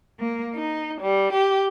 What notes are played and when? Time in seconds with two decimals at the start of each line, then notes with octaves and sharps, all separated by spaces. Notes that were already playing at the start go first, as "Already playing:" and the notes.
0.19 A#3
0.55 D#4
1.01 G3
1.33 G4